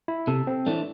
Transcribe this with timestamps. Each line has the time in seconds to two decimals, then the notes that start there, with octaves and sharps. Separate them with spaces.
0.08 E4
0.27 C3 A4
0.47 C4
0.66 E3 A3 D4